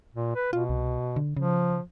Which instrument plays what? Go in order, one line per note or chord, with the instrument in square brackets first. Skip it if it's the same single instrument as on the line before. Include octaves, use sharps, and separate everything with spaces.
[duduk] A#2
B4
[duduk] B2 [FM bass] F4
[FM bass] C2
D3
[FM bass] C#3 [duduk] F3